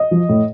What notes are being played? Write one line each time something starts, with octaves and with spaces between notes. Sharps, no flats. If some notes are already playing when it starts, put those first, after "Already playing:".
Already playing: D#5
F3
A2